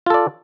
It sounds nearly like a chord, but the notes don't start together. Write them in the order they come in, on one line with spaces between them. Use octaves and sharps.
F4 A4 D5